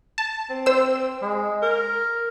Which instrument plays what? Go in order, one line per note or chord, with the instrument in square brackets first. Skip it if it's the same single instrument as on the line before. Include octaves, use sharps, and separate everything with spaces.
[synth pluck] A5
[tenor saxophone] C4
[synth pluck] C5 E6
[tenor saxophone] G#3
A#4